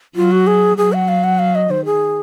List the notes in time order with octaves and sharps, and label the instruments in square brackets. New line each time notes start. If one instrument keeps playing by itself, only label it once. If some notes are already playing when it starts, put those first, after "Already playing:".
[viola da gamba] F#3 [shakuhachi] F4
[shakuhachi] F#4
G#4
[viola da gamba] F#3 [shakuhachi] G#4
[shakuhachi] F#5
F5
F#5
F5
D#5
[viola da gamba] D#3 [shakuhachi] C5
[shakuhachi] G#4